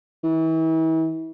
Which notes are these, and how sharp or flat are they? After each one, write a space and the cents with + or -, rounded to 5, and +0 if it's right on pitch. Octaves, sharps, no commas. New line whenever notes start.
E3 -35